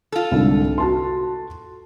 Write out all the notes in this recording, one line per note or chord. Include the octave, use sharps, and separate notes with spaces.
F4 A4
C2 G#2 D3
F#4 A5 C6